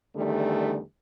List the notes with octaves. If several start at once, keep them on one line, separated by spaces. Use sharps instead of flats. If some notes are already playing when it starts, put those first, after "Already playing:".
E2 D3 D#3 G3 A3